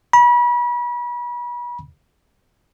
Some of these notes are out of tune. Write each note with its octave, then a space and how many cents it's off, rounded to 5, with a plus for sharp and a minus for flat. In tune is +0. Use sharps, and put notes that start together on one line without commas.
B5 -35